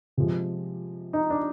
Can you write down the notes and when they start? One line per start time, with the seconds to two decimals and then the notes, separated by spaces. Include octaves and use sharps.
0.17 C3 F3 G#3
1.13 D#4
1.30 D4